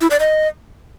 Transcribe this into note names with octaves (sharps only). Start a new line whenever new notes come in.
E4
D5
D#5